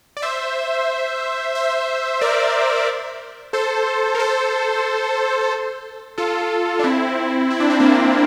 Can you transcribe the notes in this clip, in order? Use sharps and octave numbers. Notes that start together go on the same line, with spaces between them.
D5
C5 E5
C5 E5
A#4 D5
A4 C5
A#4
A4 C5
F4 A4
D4
C4 E4
E4
D4
C4
A#3 D4